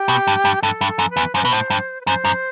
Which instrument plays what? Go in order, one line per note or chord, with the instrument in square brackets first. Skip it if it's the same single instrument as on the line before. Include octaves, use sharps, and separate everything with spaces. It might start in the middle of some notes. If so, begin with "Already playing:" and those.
Already playing: [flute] G4
[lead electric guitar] B2
G2
G2
[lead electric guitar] G2 [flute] A4
[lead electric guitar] G2
[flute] A4
[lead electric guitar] F#2
[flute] B4
[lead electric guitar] E2
[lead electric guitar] F#2 [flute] C5
[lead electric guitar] B2 [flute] B4
[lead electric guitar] A2 [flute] C5
[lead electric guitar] G2
[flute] B4
[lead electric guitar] F#2 [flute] C5
[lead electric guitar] F#2